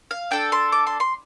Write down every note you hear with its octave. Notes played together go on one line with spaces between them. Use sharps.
F5
D4 A4 G5
C6
D6
C6
C6